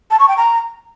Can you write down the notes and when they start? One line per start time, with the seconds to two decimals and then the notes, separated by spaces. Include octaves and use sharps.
0.11 A5
0.20 C#6
0.28 G5
0.37 A#5